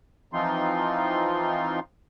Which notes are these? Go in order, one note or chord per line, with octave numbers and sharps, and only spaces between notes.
E3 F3 C4 D#4 F4 C6